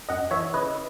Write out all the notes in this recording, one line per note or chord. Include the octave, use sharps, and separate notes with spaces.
F#2 D#5 F#5
E3 C#5 E5
C#3 B4 D#5